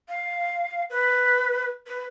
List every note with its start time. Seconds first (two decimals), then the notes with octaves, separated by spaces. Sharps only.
0.09 F5
0.90 B4
1.87 B4